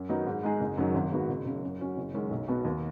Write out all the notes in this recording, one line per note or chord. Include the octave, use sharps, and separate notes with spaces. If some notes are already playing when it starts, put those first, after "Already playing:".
Already playing: F#2
D#3 F#3 B3 D#4
G#2
G#3 D#4 G#4
F#1
F#2 D#3 F#3
G#1
G#2 D#3 B3 F#4
F#1
F#2 C#3
F#2
F#3 C#4 F#4
F#1
F#2 D#3 G#3 C#4
B1
B2 B3 F#4
D#2